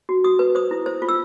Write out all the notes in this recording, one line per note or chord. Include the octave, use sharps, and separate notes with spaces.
F#4
F#4 D#6
B4
C5 D#6
E4
C5
F4
E6